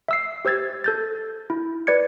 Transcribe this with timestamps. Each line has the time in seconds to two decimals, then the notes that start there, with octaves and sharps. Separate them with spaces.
0.08 E5 E6 C7
0.45 G4 C5 E6 G#6 A6
0.84 A4 G6 A6
1.50 E4
1.87 B4 D5 G#6 C#7